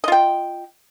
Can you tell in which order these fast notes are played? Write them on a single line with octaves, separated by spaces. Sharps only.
D#5 F4 G5